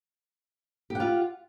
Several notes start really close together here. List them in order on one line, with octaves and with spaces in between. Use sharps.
G4 F#5 F4